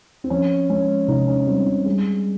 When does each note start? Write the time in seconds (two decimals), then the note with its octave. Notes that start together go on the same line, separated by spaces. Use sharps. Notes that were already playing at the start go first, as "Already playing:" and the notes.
0.24 C4
0.30 F3 C#4
0.70 G#3 C#4
1.08 C3 D#4
1.28 C#4
1.47 G3 C4
1.66 C4
1.86 G3 G#3